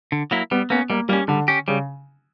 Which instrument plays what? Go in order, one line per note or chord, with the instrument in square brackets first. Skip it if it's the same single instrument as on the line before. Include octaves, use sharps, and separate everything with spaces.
[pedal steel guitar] D3
F#3 A#3 E4
[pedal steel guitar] G3 [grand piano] B3
[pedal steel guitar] A#3 C#4 [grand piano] B3
[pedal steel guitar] G3 [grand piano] A#3
[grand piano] G3 [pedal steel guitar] A#3 C#4
[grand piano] D3 [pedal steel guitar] G3
[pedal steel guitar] C#4 G4
[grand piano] C#3 [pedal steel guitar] G3